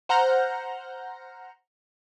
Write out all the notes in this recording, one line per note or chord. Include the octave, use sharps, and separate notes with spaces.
C5 F#5 A#5 F6 G6 A#6